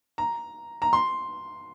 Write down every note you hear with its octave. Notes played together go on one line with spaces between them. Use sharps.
A#5
A#5
C6